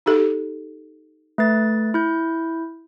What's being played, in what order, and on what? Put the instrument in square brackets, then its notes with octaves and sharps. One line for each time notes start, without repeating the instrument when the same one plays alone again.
[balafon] D#4 G4 A4
[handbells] A3 B4 A6
E4 G6